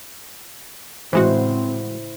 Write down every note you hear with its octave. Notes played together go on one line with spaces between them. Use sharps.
A2 C#3 E3 G#3 C4 E4 F#4 C5